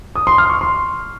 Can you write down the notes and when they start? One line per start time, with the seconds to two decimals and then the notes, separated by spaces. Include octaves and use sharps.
0.16 D#6
0.27 C6
0.38 F6
0.50 C#6
0.61 C6